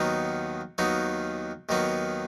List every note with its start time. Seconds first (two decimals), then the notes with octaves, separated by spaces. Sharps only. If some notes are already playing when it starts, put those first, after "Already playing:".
Already playing: D#2 D#3 F#3 B3 D#4
0.78 D#2 D#3 F#3 B3 D#4
1.69 D#2 D#3 F#3 B3 D#4